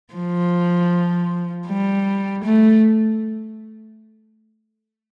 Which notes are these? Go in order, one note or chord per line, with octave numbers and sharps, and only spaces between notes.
F3
G3
A3